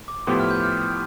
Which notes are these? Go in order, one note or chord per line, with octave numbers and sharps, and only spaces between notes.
D6
A2 F3 B3 E4 G4 C6
F6
G6
F6